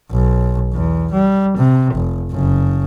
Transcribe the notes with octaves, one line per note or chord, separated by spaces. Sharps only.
B1
E2
G3
C3
F1
F#1 C#3